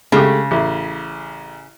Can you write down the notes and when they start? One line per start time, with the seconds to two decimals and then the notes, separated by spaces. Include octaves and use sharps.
0.12 C#3 G#3 A3 G4
0.51 A1